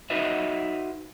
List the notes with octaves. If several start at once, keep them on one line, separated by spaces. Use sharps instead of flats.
D#4 F#4 B4 D#5 E5